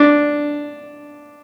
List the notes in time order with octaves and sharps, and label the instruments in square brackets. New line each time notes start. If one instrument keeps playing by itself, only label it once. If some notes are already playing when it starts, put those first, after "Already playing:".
Already playing: [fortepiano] D4